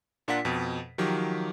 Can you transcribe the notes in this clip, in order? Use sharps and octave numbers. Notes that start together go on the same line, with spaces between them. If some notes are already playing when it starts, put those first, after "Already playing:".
A#2 D4 F4 A#4 F#5 B6
F2 B2
D#3 F3 F#3 G4